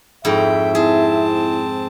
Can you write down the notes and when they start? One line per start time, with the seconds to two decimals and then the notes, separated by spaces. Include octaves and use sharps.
0.25 F2 G#2 E4 E5 G5
0.75 C4 E4 G#4 A5